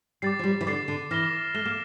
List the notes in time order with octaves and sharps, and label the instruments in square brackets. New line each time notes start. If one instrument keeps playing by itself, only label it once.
[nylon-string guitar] G3 [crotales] D6 A6 C7
[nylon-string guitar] F3
G3
E3
[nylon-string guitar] D3 [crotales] D6 A6 C7
[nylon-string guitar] D3
[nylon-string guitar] E3 [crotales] F6 A#6 E7 G7
[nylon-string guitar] A3 [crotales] F6 A#6 E7 G7
[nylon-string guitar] A#3